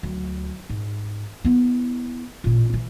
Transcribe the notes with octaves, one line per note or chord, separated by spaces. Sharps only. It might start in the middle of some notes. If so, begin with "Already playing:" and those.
D2 F#3
G#2
B3 E4
A1 A#2
E3